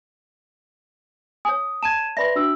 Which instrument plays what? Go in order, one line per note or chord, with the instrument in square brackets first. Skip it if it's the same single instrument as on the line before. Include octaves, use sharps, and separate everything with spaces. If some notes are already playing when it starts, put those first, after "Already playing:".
[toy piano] C#5 G#5 [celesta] D#6
[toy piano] A5 [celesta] G#6 D#7 E7
[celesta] B4 D5 A#6 [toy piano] E5 B5 C6
[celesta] D4 F#4 E6